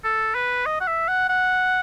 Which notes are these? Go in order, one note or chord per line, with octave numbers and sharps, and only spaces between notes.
A4
B4
D#5
F#5
E5
F#5
F#5